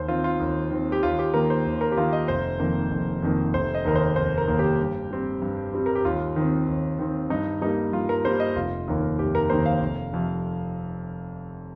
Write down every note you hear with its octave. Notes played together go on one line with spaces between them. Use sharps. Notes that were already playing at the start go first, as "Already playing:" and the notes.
Already playing: D#2 C5
D#3 C4 F4
F4
D#2
D#3 C4
G4
D#2 F4
G4
D#3 A#3 A#4
C5
D#2
A#4
G4
D#3 A#3 F4
D#5
F1 C5
F2 D#3 A#3
F1
F2 D#3 A#3
F1 C5
D#5
D#2 D#3 A#3 A#4
C5
F1 C5
A#4
D#2 D#3 A#3
G4
G2
G3 C4
G2
G3 C4
A#4
G4
D#2 F4
D#3 C4
D#2
D#3 C4
G2 D#4
G3 A#3 D#4
G2 F4
A#4
G3 A#3 C5
D#5
F1 F4
D#2 D#3 A#3
F1 G4
A#4
D#2 D#3 A#3 C5
F5
F1
F2 C3